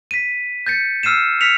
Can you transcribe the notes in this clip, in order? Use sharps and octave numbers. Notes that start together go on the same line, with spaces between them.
B6 D#7
G6 A6 C#7
E6 F6 C7 D#7 E7
F6 B6 C#7 F7